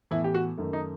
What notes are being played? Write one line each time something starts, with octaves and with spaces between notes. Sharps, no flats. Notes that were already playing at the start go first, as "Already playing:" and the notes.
A2 E3 B3 E4
G4
F#4
F#2 D#3 A3
D#4